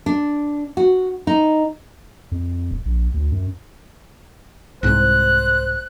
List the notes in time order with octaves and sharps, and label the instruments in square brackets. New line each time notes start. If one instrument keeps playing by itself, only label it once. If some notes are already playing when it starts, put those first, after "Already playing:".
[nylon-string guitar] D4
F#4
D#4
[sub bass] F2
D#1
A#1
D2
F#2
[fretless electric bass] C2 G#2 [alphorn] C5 [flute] F#6